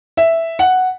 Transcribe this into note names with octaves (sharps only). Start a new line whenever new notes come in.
E5
F#5